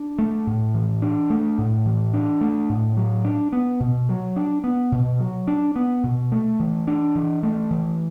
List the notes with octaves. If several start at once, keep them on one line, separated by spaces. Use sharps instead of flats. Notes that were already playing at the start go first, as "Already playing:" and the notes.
Already playing: D4
A3
A2
E3
D4
A3
A2
E3
D4
A3
A2
F#3
D4
B3
B2
F#3
D4
B3
B2
F#3
D4
B3
B2
A3
E3
D4
E3
A3
E3